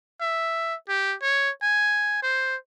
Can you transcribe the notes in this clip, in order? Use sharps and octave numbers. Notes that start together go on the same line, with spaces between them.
E5
G4
C#5
G#5
C5